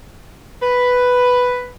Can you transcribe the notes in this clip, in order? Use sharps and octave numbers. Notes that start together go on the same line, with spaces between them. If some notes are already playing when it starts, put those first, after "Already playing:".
B4